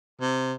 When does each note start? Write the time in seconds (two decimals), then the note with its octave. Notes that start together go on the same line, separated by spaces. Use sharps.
0.21 C3